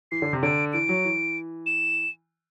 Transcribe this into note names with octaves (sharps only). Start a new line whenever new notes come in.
E3 C7
D3
C3
D3 D7
E3 D7
F#3
E3
E7